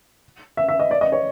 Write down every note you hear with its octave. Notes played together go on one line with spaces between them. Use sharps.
E5
E5
D#5
D5
D#5
C#5